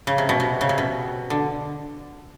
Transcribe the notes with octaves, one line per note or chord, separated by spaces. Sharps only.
C#3
C3
B2
C3
C#3
C3
B2
D3